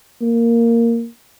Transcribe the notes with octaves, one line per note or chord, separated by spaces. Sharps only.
A#3